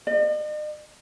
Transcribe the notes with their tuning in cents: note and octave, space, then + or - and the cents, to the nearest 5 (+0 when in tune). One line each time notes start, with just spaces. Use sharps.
D#5 -45